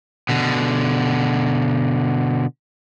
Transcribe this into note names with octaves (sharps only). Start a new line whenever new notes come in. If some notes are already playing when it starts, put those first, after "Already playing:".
B2 D3